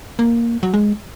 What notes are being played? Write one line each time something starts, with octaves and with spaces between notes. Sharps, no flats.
A#3
F#3
G#3